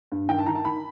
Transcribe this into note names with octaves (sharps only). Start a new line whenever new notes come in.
G2
D#3 G5
A5
D#3 A#5
A5
D#3 B5